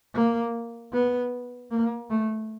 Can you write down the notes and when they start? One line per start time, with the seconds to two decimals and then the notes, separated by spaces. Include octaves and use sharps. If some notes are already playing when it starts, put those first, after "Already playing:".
0.14 A#3
0.93 B3
1.71 A#3
2.10 A3